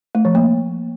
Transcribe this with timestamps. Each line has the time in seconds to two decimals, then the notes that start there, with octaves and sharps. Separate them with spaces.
0.15 A3
0.25 F3
0.35 A#3